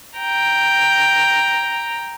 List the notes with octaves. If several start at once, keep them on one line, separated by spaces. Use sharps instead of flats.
G5 A#5